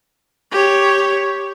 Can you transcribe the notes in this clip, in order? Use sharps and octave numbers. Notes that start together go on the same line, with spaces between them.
G4 C#5